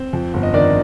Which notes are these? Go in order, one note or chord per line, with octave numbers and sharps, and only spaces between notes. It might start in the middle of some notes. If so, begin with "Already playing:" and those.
Already playing: C4 C5
F2
G1
D#5
D#3 D4 D5